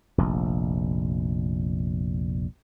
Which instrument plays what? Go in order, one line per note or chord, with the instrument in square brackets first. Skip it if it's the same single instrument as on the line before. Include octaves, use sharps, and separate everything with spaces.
[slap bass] F1 A#1